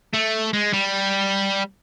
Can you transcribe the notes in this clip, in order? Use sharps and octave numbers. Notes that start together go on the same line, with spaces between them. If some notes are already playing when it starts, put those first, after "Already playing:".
A3
G#3
G3